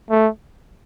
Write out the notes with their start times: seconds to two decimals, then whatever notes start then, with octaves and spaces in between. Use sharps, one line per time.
0.10 A3